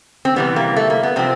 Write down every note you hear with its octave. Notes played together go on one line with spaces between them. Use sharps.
C4
C3 E3 G3 B3
A#3
A3
A#3
B3
C3 F3 C4